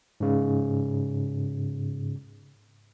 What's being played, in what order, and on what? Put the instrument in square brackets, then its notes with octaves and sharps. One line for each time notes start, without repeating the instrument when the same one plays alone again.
[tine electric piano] G#2 C#3